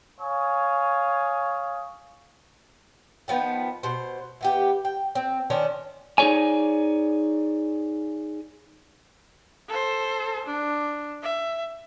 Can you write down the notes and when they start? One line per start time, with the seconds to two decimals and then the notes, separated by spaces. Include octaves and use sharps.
0.20 C#5 F5 G#5 D#6
3.28 D#3 F3 B3
3.83 B2 C5
4.41 E3 B3 G4
4.85 G5
5.15 C4
5.50 D#3 C#4 D4 C5
6.18 D#4 G#4 A4 C#5 D5 G#5
9.69 A4 C5
10.46 D4
11.23 E5